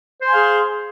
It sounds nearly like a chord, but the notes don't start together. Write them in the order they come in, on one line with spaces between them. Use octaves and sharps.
C5 C6 G#5 F5 G#4